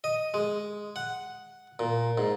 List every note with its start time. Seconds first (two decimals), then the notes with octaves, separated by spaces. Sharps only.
0.04 D#5
0.34 G#3
0.96 F#5
1.79 A#2
2.18 G#2